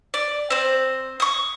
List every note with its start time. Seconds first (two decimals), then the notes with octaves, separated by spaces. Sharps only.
0.14 D5
0.50 C4 C5
1.20 C#6 D#6